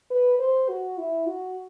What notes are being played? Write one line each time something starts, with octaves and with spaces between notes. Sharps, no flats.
B4
C5
F#4
E4
F#4